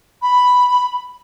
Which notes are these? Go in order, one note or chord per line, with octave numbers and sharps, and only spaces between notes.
B5